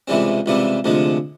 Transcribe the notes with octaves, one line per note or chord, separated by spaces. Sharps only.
C#2 C3 E3 G3 C4
C#2 C3 E3 G3 C4
D2 C3 F3 G#3